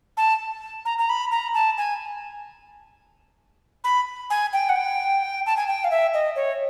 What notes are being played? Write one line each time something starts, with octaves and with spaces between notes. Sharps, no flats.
A5
A#5
A#5
B5
A#5
A5
G#5
B5
G#5
G5
F#5
G5
A5
G#5
G5
F5
E5
D#5
C#5